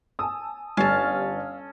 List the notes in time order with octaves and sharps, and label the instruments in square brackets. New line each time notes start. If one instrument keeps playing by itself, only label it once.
[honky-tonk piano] G#5 A5 E6 [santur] D#6
[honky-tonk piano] G1 G3 [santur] C#4 A4 [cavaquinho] F5 A5